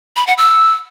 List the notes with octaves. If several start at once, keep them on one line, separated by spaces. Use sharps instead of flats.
B5
F#5
E6